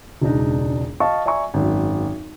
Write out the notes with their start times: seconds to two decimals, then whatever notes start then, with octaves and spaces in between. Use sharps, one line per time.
0.21 E1 C#2 D4 D#4
1.00 D#5 F5 A5 C#6
1.26 D5 E5 G#5 A#5 C#6
1.54 G#1 F#2